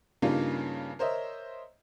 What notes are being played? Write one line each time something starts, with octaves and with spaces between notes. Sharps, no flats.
G2 C#3 G3 A#3 D#4 F4
A#4 C5 C#5 D#5 E5